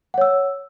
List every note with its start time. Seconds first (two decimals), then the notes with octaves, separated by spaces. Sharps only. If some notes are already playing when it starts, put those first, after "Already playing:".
0.14 F#5
0.18 C#5
0.21 E6